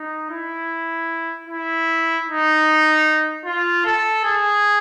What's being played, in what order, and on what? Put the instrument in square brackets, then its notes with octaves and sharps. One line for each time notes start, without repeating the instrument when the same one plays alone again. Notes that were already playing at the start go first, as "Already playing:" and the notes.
Already playing: [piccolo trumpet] D#4
E4
E4
D#4
F4
A4
G#4